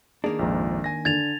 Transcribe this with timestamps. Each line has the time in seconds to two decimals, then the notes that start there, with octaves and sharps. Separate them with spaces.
0.24 D#3 A#3 D4 G#4
0.39 A#1 F2 G#2
0.84 G#5 A#6
1.05 D3 G#6 A6 F7